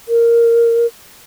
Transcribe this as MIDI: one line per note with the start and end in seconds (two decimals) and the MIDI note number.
0.08 0.86 70